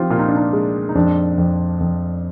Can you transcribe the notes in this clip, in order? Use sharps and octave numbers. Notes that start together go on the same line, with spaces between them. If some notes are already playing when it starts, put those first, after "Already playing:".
Already playing: F3 C4 D#4 F4 G4
A#2 F4
D#4
D4
D#4
G#3
D#4
F2 D4
F2
F2